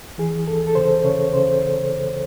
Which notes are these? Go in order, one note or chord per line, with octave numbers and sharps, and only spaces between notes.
E3 G#4
D#2 A4
A4
C#3 C5
C#3 C#5
C#3 C5